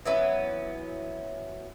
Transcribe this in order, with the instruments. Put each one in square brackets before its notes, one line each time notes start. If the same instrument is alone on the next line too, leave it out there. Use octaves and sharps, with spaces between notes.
[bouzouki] E3 F#3 B3 C#4